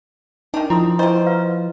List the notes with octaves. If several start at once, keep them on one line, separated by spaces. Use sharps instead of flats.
D#3 D4 D#4
F3 E4 C6 D#6
B2 E4 C5 D#5
B4 F5